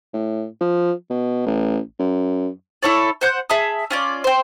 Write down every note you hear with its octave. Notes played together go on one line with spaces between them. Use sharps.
A2
F3
B2
A1
F#2
E4 A4 C#5 D5
C5 F#5 G6
G#4 E5 A5 D#6
C#4 F4 D5
C5 G5